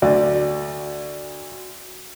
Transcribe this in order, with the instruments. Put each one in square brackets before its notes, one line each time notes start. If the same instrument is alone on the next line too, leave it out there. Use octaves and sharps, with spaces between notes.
[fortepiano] D2 D5 [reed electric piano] F#4